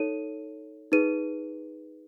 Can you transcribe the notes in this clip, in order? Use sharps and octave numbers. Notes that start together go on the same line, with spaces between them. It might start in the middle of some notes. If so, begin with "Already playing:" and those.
Already playing: D#4 A4 C#5 D#7
D#4 G#4 B4 D#7